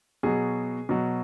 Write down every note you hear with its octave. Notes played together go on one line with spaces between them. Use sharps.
B2 F#3 G#4
B2 F#3